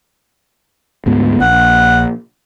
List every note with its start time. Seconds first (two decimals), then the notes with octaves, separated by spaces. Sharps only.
1.06 D2 G#2 B3
1.41 A#1 F#5